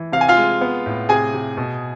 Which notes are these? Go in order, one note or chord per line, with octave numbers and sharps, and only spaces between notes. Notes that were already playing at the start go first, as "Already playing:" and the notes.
Already playing: E3
C3 F5
G#5
F4 F5
G#3
B3
A2
C3 G#4 G#5
C3
B2